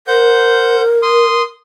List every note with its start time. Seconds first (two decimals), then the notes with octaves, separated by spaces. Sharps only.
0.07 A#4 C5 F#5 G6
1.02 C6 D#6